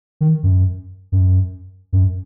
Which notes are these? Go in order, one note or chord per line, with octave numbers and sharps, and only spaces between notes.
D#3
F#2
F#2
F#2